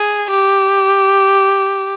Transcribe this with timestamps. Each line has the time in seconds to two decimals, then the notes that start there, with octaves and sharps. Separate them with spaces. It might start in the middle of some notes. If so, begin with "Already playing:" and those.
Already playing: G#4
0.30 G4